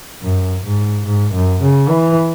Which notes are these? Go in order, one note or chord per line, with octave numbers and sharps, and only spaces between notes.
F#2
G#2
G#2
F#2
C#3
E3